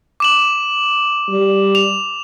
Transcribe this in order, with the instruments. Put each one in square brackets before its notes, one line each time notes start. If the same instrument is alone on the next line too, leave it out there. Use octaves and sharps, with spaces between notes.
[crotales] D6 E7 F#7
[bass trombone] G3
[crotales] F7